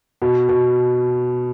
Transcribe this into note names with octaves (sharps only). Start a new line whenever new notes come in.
B2
B2